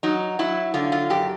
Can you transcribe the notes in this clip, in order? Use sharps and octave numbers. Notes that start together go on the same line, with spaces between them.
F#3 D#4
F#3 E4
D3 F4
F4
F#2 G4